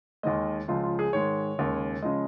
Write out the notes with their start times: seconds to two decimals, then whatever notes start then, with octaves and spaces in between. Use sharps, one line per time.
0.23 D#2 D#3 G#3 D#5
0.68 C#2 C#3 F3 G#3 F4
0.83 F4
0.99 G#4
1.13 G#2 D#3 G#3 C#5
1.58 D#2 C#3 G#3
2.02 C#3 F3 G#3 D#5